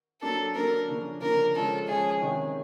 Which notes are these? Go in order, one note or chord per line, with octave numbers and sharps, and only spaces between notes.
F#3 A#3 D4 A4
F#3 A#3 D4 A#4
C#3 F3 A#3 D4
C#3 F3 A#3 D4 A#4
F3 G#3 C#4 F4 A4
F3 G#3 C#4 F4 G#4
C3 D#3 G#3 C#4